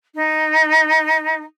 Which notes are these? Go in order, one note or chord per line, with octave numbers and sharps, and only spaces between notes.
D#4